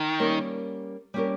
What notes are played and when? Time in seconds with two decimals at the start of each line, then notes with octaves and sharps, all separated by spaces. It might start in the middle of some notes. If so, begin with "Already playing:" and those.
Already playing: D#3
0.20 G3 A#3 C#4 G4 A#4
1.14 G3 A#3 C#4 G4 A#4